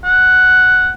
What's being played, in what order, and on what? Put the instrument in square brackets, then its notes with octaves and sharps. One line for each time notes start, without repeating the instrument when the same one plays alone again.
[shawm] F#5